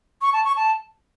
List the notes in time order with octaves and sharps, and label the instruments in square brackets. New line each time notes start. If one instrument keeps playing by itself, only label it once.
[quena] C#6
A5
C#6
A5